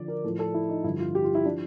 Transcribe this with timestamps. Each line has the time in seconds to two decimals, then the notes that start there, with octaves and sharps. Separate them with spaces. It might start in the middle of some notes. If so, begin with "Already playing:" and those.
Already playing: D3 F3 D5
0.08 A#4
0.24 A2 F3 A4
0.39 A4
0.54 E4
0.69 D#4
0.84 G2 D3 F3 E4
0.99 F4
1.15 G4
1.24 F4
1.35 E4
1.45 F3 D4